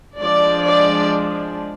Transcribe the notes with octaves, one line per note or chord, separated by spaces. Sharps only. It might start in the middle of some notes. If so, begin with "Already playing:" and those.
F3 G#3 D4 D5
D5